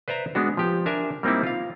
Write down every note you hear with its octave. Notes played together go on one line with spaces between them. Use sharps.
B4 C5 D5 E5 A#5
G#3 B3 D4 F#4
F3 G4
D4 A#4 E5 G#5
G3 A#3 C4 D#4 E4
F4 F5